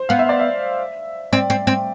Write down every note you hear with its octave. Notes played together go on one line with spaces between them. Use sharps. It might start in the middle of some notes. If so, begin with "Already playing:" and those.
Already playing: C5
B3 F5
E5
D5
E5
C4 D5
C4
C4